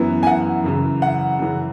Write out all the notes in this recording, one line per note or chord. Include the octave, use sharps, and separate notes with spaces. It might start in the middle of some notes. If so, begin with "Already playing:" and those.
Already playing: F#2 E3 B3 E4
G#5
F#5
F#2 C#3 E3
F#5
F#2 C#3 E3